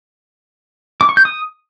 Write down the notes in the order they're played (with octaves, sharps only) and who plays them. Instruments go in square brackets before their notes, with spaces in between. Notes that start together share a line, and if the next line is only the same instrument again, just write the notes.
[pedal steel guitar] D6
C#6
G6
D#6